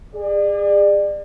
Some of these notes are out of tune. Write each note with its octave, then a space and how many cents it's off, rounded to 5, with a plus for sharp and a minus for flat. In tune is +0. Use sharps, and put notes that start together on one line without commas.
G#4 -30 D5 +30